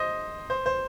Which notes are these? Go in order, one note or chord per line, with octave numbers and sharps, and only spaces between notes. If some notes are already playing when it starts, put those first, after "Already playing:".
Already playing: C5 D#5
C5
C5